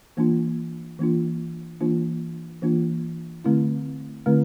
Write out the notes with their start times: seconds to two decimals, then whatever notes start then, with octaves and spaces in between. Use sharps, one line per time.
0.17 E3 A#3 D4 F4
0.99 E3 A#3 D4 F4
1.81 E3 A#3 D4 F4
2.62 E3 A#3 D4 F4
3.45 D3 A3 C4 E4
4.26 D3 A3 C4 E4